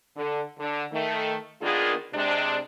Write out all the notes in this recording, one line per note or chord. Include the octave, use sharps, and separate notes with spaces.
D3
D3
D#3 A3
D#3 A#3 B3 D4 F4 G#4
C3 G#3 D4